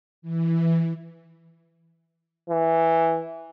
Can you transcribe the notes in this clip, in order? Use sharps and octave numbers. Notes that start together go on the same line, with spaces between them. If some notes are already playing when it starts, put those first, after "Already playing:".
E3
E3